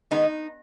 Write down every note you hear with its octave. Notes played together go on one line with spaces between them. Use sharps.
D#3 G#3 B3 D#4